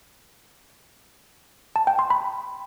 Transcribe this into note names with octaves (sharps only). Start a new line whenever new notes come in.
A5
G5
C6
B5